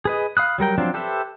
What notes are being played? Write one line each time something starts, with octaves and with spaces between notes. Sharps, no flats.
G#4 B4 D#5
F5 B5 D#6 F#6
F#3 G3 A#4 G5
F3 F#3 C4 D4 F4
G4 A4 B4 C5 E5